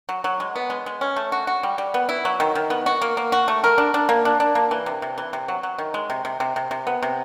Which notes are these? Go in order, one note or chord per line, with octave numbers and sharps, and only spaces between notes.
F#3
F#3
G#3
B3
G#3
G#3
C#4
A3
F#4
F#4
G3
G3
B3
E4
F#3
D#3
D#3
B3
F#4
A#3
A#3
F#4
A3
A#4
D4
D4
A#3
D4
D4
A#3
E3
C3
C3
E3
C3
F#3
F#3
D#3
G#3
C3
C3
C3
C3
C3
B3
C3